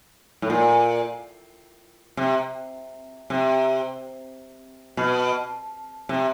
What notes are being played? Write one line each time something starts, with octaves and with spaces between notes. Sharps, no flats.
A2
A#2
C3
C3
B2
C3